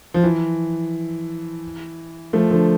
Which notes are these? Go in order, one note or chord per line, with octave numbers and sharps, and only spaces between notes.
F3
E3
F3 A3
D3 F3